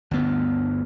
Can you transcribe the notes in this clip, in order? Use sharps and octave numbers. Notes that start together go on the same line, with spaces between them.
G1 D2 B3